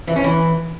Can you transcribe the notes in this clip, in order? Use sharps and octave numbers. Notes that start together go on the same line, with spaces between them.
E3
C#4
E3